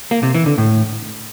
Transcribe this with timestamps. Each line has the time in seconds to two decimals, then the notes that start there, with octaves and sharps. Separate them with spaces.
0.11 A#3
0.23 C3
0.34 E3
0.46 D3
0.58 A2